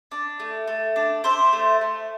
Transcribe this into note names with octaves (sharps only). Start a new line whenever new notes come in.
D4
A3
A3
D4
D4 C5 E5
A3
A3